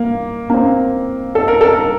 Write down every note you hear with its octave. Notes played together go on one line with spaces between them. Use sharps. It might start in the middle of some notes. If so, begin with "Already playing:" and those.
Already playing: A#3
A#3
C4
A4
A#4
A4
A#4